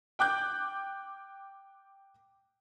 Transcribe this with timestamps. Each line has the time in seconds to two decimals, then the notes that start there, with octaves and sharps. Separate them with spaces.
0.19 G5 D6 F#6 G6